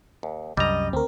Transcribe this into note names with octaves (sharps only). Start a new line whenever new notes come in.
D#2
C2 F#2 G3 D#5 A#5
D2 C4 A#4